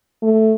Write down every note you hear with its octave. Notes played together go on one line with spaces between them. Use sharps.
A3